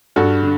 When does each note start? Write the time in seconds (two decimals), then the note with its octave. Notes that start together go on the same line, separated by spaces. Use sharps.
0.16 G2 F#4 A4
0.43 D3